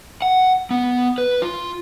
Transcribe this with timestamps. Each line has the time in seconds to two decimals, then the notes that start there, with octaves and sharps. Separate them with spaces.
0.22 F#5
0.71 B3
1.18 B4
1.42 F4